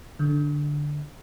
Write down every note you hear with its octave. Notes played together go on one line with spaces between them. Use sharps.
D3